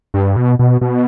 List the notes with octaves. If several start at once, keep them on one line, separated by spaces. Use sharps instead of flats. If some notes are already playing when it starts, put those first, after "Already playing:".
G2
B2
B2
B2